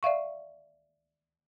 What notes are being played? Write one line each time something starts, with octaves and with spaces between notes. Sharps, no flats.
D5 E5 F5 C#6